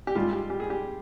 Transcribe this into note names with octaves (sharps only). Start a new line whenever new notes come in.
G4
G#2 G3 F4
G4
G4
G#4
G4